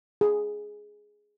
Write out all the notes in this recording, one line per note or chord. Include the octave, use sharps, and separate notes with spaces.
G#4